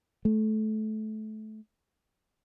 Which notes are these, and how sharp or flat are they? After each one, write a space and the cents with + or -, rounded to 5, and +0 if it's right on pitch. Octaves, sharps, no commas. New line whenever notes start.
A3 -25